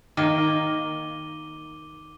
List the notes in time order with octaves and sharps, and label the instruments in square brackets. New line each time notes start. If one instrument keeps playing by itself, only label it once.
[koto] D#3 A#3 [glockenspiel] D6 D#7 G7